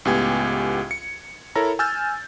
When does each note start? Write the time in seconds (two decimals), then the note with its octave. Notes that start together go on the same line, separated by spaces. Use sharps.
0.05 C#2 A2 B3 G4 G#5 G#6
0.91 C#7
1.55 E4 A4 A#4 C#5 A#5
1.79 G#5 E6 F6 G6 A6